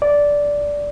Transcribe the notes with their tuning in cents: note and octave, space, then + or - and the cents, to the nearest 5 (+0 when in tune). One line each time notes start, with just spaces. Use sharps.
D5 -10